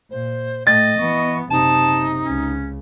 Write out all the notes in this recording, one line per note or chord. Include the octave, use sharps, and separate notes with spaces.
A#2 C5
A2 A3 D#5 G5 A6
E3 B3 C#6
F#1 C3 D#4 A5
C#2 C#4